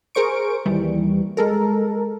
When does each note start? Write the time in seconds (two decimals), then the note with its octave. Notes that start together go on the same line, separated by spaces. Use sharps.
0.15 G#4 A#4 C5 C#6 D7
0.66 D#2 E3 G3
1.37 G#3 A4 A#4